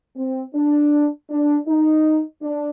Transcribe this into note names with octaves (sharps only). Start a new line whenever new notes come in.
C4
D4
D4
D#4
D4